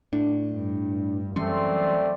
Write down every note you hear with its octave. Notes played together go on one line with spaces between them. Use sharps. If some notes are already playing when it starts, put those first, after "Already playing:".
A2 D4
G2
F#2 E3 G3 A3 C4 C#4 D5 C6